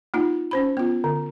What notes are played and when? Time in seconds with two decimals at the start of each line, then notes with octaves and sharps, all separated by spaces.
0.14 A#3 D#4 F4
0.51 C#4 C5 B5
0.77 B3 F4
1.04 D3